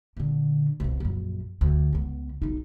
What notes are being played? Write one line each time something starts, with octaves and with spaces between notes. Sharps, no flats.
A#2 D3
C2 B2
A#1 F#2
D2
C#2 B3
B1 D#4